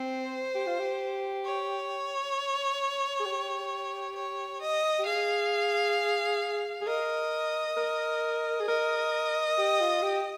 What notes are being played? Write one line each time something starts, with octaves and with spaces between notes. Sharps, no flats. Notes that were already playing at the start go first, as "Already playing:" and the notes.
Already playing: C4 C5
G4
F4
G4
C#5
G#4
G4
C#5
D#5
G4
G#4 F5
G#4
A#4 D#5
A#4
G#4
A#4 D#5
G4
F4
G4